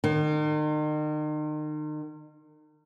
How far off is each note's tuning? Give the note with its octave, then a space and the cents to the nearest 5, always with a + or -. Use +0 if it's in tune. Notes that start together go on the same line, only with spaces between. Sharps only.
D#3 -40